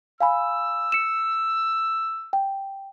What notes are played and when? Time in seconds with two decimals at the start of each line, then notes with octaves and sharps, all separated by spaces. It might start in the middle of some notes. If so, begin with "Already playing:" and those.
0.21 F5 G#5 B5 E6
0.92 C#7 E7
2.33 G5